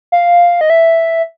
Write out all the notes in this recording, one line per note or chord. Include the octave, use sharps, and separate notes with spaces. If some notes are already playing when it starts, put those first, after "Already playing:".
F5
D#5
E5